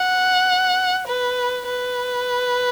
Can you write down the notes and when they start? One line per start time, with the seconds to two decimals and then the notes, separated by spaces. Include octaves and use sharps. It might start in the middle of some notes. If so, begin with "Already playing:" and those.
Already playing: F#5
1.07 B4
1.66 B4